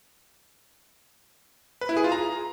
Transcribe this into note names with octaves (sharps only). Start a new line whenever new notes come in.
B4
E4
G#4
F4
A#5